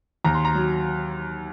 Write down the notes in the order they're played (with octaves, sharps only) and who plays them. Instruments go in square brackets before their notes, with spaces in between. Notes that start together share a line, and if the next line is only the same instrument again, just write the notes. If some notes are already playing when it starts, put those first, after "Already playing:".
[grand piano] D#2 A#5
C6
A#5
F#3